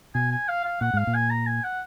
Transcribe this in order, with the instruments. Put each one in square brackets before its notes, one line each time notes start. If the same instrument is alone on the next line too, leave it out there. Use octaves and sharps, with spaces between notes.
[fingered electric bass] B2 [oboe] G#5
[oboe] G#5
F5
F5
[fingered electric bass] A#2 [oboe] F#5
[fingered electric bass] G#2 [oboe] F5
[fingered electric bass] A#2
[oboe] G#5
A#5
G#5
F#5